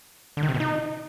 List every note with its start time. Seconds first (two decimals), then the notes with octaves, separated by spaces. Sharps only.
0.37 D3
0.43 D#3
0.49 C3
0.54 B2
0.60 D#4